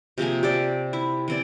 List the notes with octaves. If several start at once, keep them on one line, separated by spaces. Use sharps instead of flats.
C3 F3 A#3 G#4
G4 A4 C5 D5
E4
E3 C4 D5